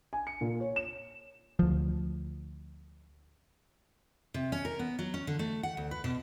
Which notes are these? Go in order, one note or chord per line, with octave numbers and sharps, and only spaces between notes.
G#5
C#7
A#2
C#5
E7
D2 F3
C3
C#4
A#4
B3
F#3
C#4
D3
A3
F#5
D2
B4
B2